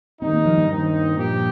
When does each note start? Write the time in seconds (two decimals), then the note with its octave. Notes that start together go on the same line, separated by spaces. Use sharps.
0.21 D#3 G3 C4 D#4
0.33 A#3
0.45 F3
0.57 G2
0.68 D#2 D#3 C4 D#4
1.15 A#2 F3 A#3 G4